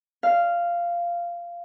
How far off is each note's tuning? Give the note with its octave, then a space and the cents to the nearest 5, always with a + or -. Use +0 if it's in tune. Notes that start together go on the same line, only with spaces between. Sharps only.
F5 -10